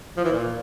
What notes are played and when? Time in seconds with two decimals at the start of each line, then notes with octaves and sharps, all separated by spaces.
0.17 F3
0.25 E3
0.32 A#2